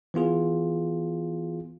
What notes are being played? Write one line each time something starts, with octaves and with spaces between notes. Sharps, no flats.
E3 B3 F4 G#4